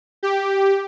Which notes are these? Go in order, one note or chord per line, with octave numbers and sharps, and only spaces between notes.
G4